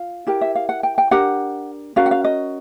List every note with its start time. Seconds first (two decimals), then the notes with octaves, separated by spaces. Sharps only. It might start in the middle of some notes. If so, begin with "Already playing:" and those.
Already playing: F4 F5
0.27 E4 G4 A#4
0.41 E5
0.55 F5
0.69 F#5
0.83 G5
0.98 G5
1.11 D4 G4 A#4 F#5
1.96 C#4 F#4 A#4 F5
2.06 F#5
2.11 F5
2.24 D#5